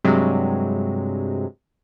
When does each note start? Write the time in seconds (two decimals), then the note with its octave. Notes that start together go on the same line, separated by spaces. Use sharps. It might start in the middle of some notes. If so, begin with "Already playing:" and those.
0.04 G2 C3 F#3 G#3